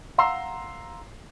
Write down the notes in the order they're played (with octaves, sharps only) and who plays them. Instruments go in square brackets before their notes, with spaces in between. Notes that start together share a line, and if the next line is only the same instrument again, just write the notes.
[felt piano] F5 F#5 A#5 C6 E6 C7